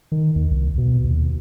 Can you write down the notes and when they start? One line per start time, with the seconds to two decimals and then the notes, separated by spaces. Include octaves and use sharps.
0.12 D#3
0.36 D#2
0.51 C2
0.78 B2
1.04 D#2